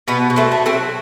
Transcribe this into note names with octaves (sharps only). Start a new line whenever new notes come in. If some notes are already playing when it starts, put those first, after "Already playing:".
B2 B3
B2
A3 C4
A3
A3 C4
F#3